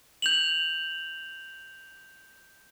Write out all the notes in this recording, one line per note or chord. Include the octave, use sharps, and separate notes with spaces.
G6 F7 F#7